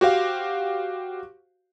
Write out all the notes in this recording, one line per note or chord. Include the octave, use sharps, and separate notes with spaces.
F#4 G4 C5 F5